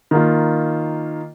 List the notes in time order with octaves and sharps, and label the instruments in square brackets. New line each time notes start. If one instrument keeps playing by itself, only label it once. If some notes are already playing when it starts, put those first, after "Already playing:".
[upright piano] D#3 A#3 F4